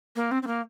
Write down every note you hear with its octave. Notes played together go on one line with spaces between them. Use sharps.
A#3
C4
C4
A#3